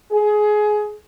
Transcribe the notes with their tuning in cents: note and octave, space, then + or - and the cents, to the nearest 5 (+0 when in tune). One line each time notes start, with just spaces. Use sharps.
G#4 +20